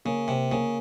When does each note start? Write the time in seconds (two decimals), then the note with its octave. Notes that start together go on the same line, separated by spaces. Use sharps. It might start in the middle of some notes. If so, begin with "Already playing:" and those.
0.05 C#3 A#3
0.28 C3
0.52 C#3 A#3